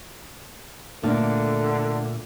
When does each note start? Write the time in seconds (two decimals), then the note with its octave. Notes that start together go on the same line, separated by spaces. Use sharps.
1.03 A#2 D3 A3 D4